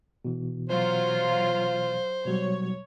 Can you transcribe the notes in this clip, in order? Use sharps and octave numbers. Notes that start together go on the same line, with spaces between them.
B2 E3
F#3 F4 C5
B2 F#3 G3 C#5